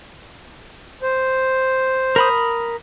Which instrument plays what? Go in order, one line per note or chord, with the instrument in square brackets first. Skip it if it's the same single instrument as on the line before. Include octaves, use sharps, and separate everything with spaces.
[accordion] C5
[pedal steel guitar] A#4 B5 D#6